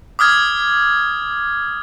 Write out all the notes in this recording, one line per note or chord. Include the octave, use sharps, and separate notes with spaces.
D6 D#6 F6 G#6